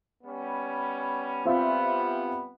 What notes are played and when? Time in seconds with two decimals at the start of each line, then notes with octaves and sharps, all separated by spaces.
0.24 G3 B3 C#4
1.45 G3 B3 C4 F4 E5